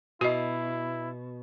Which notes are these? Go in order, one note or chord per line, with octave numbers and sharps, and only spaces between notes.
B2 E4 F#4 D#5